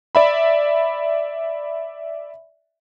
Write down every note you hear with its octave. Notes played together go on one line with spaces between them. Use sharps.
D5 E5 B5